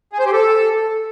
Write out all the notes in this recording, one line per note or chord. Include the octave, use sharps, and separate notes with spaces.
G#4
C5
G4
A4